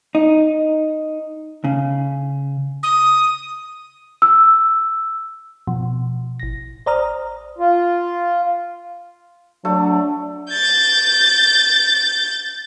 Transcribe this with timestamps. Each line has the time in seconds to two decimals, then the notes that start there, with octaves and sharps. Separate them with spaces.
0.15 D#4
1.64 C#3
2.83 D#6
4.22 E6
5.67 B2 F3
6.40 A1 A#6
6.86 C5 D5 A#5 D#6 F6
7.58 F4
9.65 F#3 A3 D4
10.50 G6 A6